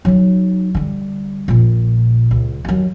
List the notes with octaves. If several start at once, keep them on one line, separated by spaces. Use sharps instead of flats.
F#3 D#4
D3 G3
A#1 A#2
C#2
D#2 F#3